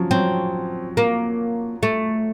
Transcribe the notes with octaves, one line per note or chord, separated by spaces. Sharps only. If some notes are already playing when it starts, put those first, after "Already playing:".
Already playing: F3 F#3 C#4
F#3 C4
A#3
A3